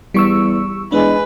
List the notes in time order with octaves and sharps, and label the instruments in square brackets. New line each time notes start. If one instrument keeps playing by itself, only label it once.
[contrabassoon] E2 [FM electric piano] G3 C#6 E6
[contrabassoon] E2 [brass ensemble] G#3 [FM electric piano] D4 [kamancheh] B4